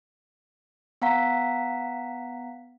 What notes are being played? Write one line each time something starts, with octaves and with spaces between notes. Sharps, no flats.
B3 F5 F#5 A#5 B6